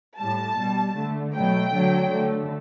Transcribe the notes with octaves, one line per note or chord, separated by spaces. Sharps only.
A2 G3 A5
B2 G3
D3 A3
B2 F#3 A3 G5
D3 F#3 A3
D3 A3